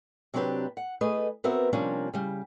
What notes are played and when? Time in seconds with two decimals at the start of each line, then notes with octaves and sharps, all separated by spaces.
0.34 C3 F#3 C4 D4 G4 B4
0.77 F#5
1.01 A3 G#4 B4 D#5
1.44 B3 C4 F#4 A#4 B4 E5
1.73 C3 F3 G3 A#3 C#4 D4
2.13 C#3 G3